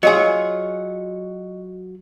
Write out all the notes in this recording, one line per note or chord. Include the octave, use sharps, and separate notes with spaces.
F#3 F4 G#4 D#5 C#7